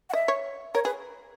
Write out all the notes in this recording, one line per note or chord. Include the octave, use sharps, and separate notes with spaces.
F#5
D#5 E5
C#5
A#4 C#5
G#4 B4